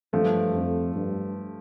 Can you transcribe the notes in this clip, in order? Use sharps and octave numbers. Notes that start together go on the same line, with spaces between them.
G2 F3 A3
F2
G2